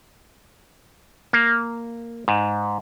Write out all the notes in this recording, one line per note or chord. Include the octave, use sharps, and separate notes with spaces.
A#3
G#2